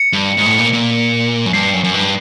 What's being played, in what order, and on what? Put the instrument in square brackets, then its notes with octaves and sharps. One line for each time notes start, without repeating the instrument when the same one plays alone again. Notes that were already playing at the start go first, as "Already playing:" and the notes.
Already playing: [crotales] C#7
[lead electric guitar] G2
G#2
A2
A#2
A#2
F#2
[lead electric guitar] G2 [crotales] C7
[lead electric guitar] F#2
F#2
G2